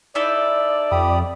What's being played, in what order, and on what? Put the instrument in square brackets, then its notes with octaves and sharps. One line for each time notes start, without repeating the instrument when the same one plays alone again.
[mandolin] D#4 E4 A4 [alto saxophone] D5
[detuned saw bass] F2 [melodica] G4 B5 D#6